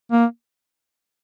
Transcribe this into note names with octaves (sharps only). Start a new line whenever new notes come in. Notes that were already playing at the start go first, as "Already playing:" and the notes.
A#3